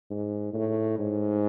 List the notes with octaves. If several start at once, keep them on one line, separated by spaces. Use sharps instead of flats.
G#2
A2
G#2